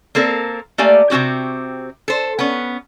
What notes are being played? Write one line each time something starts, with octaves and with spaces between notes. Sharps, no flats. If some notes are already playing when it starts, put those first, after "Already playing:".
A#3 C4 A4 A#4
A3 A#3 G4 D5 G#5
C3 C4 C#4 F#4 G4
A4 C5
B3 C#4